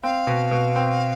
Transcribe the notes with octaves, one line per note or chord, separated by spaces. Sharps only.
C4 F5
B2
B2
C4